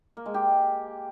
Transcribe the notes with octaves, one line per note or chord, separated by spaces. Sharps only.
A#3
G#3
G4